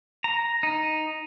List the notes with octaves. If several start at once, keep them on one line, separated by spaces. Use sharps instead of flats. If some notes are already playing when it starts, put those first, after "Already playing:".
A#5
D#4